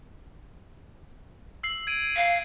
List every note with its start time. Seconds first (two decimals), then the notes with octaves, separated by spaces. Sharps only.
1.63 E6 C7 F#7
1.87 G#6 D7 D#7
2.16 F5